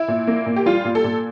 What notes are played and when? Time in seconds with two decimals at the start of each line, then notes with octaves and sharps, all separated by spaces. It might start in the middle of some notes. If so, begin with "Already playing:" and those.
Already playing: E4
0.08 A#2
0.27 A#3
0.46 A#2
0.56 G4
0.66 G3 F4
0.85 A#2
0.95 A4
1.04 A#2